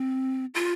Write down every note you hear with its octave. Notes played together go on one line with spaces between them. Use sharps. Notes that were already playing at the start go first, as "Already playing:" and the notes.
Already playing: C4
F4